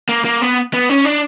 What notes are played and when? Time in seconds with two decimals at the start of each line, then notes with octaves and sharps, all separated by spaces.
0.09 A#3
0.25 A#3
0.42 B3
0.74 B3
0.89 C#4
1.05 D4